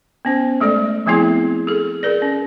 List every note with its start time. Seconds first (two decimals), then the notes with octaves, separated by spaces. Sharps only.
0.25 B3 C#4 C5
0.60 G#3 A3 A4 D5
1.06 F3 A3 B3 C4 E4 G#4
1.67 G#4 A4
2.03 G#4 A#4 B4 D5
2.22 C#4